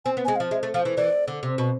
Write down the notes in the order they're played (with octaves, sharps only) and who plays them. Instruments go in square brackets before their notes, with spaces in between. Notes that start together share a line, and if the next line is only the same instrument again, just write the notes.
[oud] C4 [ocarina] G#5
[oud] B3
[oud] G#3 [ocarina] G#5
[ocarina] F5
[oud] F3
[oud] G#3 [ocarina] E5
[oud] A3
[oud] F3 [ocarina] F5
[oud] E3
[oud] E3 [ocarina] D5
[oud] D3
C3
B2